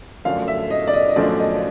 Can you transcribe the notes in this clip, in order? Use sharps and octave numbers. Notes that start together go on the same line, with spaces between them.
F#2 D3 F3 A3 D4 F5
E5
D#5
D5
D#5
D#5
F#2 D3 F3 A3 D4 D5
D#5